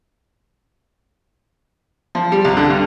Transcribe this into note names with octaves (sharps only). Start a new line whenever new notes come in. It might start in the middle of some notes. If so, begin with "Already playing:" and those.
F3
G3
C2
D3
G2